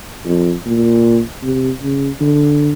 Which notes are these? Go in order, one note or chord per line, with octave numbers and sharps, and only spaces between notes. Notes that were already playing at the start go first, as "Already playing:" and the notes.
F2
A#2
C3
C#3
D3